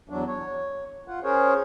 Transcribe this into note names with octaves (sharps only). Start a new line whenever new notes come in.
E2 F#3 D4
C#5
F4 F#5
C#4 G#4 A#4 C5 C#5